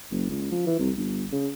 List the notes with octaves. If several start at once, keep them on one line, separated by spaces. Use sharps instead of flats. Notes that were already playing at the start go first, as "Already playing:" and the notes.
F#1
C#2
F3
E3
C2
G1
C#3